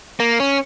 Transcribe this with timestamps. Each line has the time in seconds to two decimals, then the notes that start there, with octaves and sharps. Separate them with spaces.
0.20 A#3
0.40 C#4